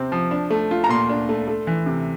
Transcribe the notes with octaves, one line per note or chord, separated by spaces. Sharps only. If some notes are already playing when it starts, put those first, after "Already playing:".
Already playing: C3 C4
F3
D4
A3
F4
A#5
A#2 C6
D4
A3
A3
E3
C3